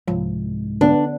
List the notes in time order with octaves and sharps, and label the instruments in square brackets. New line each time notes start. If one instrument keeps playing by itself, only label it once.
[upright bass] C2 [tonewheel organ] G#2 [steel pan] F3
[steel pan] D3 B3 B4 [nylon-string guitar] D4